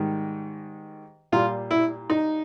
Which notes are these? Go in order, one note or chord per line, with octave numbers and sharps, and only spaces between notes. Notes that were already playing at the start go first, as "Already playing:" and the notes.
Already playing: G#2 D#3 G3
A#2 G3 F4
E4
D#4